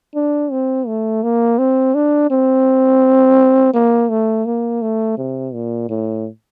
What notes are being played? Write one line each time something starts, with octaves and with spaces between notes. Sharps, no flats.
D4
C4
A3
A#3
C4
D4
C4
A#3
A3
A#3
A3
C3
A#2
A2